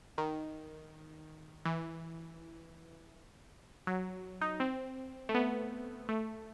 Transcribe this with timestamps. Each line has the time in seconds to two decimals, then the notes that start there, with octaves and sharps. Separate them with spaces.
0.18 D#3
1.65 E3
3.87 F#3
4.41 D#4
4.60 C4
5.29 A3
5.35 B3
6.09 A3